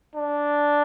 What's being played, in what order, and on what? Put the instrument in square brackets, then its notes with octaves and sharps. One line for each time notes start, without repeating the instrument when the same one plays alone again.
[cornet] D4